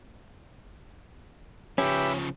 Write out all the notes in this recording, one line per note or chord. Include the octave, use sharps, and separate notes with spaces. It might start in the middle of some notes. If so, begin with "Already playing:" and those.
C#3 F3 C#4 G4 B4 E5